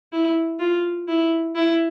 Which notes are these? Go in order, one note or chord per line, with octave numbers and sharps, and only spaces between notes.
E4
F4
E4
E4